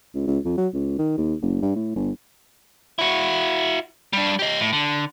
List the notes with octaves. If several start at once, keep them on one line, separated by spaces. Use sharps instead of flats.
C#2
C#2
F2
F#3
C#2
D#3
D#2
F#1
G2
A2
G1
E4 F#4
G3 D4
G4 D#5
A2
D3